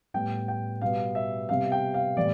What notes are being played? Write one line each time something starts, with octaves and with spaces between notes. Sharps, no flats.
A2 G3 B3 G5
G5
B2 G3 B3 F5
E5
C3 G3 B3 F5
G5
F5
A2 E3 G3 B3 D5